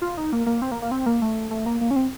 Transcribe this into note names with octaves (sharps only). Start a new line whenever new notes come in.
F4
D#4
A#3
A#3
C4
A#3
A#3
C4
A#3
A3
A3
A#3
A#3
C#4
C4